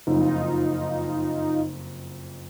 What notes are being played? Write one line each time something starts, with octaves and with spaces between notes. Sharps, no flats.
F#1 F2 D#4 F4